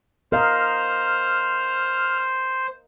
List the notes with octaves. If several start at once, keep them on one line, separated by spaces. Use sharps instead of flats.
A#4 C5 D#5 F5 F6